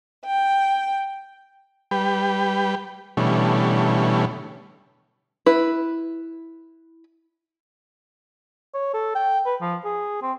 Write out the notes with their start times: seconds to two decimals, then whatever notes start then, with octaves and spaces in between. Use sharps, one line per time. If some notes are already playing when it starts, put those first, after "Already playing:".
0.24 G5
1.91 G3 B4 G5
3.17 B2 D3 E3 G3 A3 C#4
5.46 E4 B4
8.74 C#5
8.94 A4
9.15 G5
9.46 B4
9.61 F3
9.85 G#4
10.22 C4